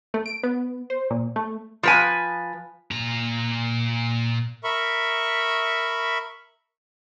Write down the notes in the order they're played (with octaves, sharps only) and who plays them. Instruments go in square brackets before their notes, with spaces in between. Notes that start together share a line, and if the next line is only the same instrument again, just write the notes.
[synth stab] A3
D7
B3
C5
A#2
A3
[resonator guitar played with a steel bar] F3 B4 G#5
[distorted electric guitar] A#2 A#5
[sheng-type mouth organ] A#4 E5 B5 C#6